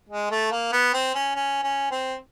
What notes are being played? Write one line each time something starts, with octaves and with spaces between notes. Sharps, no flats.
G#3
A3
A#3
B3
C4
C#4
C#4
C#4
C4